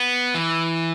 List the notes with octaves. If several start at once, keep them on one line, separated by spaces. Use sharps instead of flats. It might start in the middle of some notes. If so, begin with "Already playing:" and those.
Already playing: B3
E3